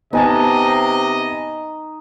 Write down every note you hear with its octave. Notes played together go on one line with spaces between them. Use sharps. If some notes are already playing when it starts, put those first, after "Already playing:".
C3 B3 D#4 D#5 G#5 A5